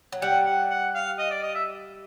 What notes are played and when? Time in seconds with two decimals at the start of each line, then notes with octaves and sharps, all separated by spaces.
0.12 F#3
0.22 G3 F#5
0.46 F#5
0.70 F#5
0.95 F5
1.18 D#5
1.31 D5
1.43 D#5
1.55 E5